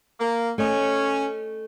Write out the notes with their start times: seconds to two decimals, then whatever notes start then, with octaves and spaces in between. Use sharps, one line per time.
0.20 A#3
0.58 A3 C#4 D#5